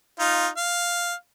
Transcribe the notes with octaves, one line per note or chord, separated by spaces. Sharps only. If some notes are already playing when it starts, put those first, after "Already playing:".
D#4 F4
F5